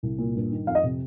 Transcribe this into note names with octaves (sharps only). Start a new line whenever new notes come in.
C2
A#2
G2
D#3
F2 F5
D#5
C3